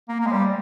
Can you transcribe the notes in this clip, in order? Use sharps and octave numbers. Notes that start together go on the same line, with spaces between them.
A#3
A#3
G#3
G3